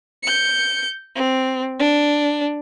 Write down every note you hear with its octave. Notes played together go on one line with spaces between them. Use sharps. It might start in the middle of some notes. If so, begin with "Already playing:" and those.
G6 C#7
C4
D4